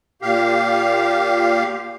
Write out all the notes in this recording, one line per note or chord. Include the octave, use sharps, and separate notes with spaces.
A#2 G4 F5